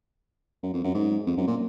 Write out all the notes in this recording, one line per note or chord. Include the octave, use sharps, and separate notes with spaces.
F#2
F2
F#2
G#2
F2
F#2
A#2